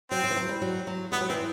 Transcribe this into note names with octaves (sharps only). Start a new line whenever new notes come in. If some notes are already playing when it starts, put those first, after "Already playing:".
F#3 C4
F#3
E3
F#3
G3
F#3
F#3
G3 B3
F#3
E3 C4